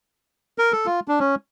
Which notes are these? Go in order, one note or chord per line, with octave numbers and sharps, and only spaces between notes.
A#4
A4
F4
D4
C#4